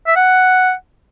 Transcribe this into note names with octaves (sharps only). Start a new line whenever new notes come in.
E5
F#5